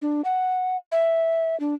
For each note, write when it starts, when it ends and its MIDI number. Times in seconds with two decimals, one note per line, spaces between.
0.02 0.22 62
0.25 0.77 78
0.92 1.58 76
1.60 1.74 62